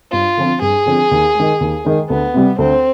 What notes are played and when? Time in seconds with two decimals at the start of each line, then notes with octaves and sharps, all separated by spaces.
0.12 G2 F4
0.37 D3 F3 C4
0.61 G2 G#4
0.86 D3 F3 C4
1.11 D#2
1.35 D#3 G#3
1.60 D#2
1.85 D#3 G#3
2.09 D2 B3
2.34 C3 G3
2.58 D2 C4